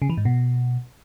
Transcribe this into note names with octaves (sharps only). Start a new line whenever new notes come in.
C#3
E3
G#2
B2